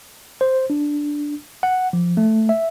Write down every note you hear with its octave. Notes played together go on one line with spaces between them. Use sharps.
C5
D4
F#5
F3
A3
E5